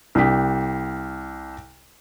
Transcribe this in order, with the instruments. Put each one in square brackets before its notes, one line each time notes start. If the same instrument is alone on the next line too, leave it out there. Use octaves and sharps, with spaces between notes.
[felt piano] C2 G4 B6